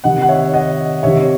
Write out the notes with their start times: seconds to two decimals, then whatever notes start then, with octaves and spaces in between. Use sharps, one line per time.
0.04 C3 D#3 D#5 F#5
0.22 F#5
0.28 C#5 E5
0.53 D#5 F#5
1.03 C3 D#3 C#5 E5